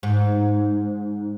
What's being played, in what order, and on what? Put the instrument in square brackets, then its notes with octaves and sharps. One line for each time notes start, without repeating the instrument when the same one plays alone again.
[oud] G#2